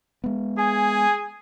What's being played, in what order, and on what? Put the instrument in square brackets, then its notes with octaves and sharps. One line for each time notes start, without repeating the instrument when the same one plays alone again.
[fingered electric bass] G#3 B3
[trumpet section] G#4 G#5